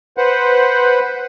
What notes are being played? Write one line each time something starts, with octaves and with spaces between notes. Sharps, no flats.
B4 C5 F#5